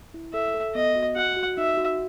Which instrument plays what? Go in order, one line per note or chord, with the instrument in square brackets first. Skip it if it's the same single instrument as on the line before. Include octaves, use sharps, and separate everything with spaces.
[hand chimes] E4
[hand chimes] A4 [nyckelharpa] E5
[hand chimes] A4
[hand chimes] B3 [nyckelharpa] D#5
[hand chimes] F#4
[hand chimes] F#4 [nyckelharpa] F#5
[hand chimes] F#4
[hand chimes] D#4 [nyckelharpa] E5
[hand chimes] F#4